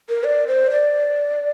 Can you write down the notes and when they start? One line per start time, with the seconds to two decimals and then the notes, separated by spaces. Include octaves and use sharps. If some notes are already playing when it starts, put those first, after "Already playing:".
0.09 A#4
0.24 D5
0.47 C5
0.70 D5